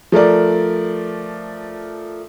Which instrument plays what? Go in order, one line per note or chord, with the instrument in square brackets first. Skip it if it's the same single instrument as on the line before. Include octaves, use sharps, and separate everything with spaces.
[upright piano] F3 A3 A#4 D5